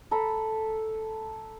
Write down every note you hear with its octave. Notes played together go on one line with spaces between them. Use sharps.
A4 A#5 B5